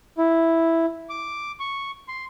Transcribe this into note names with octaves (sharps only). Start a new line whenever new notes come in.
E4
D6
C#6
C6